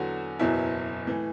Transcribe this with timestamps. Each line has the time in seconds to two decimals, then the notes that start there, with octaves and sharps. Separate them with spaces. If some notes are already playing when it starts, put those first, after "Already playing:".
Already playing: E2 D3 F#3 F#4
0.39 F#1 E2 B2 F#3 E4
1.07 A2 E3